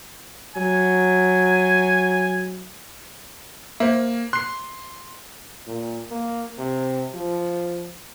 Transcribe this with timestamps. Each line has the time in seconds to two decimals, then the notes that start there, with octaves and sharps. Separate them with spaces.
0.56 F#3 G#5
3.80 A#3 C5 E5
4.33 C6 F#6 C7
5.67 A#2
6.11 A#3
6.58 C3
7.14 F3